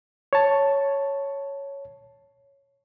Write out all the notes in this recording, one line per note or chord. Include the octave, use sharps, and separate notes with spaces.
C#5 A5